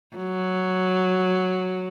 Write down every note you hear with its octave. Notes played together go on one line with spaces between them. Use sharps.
F#3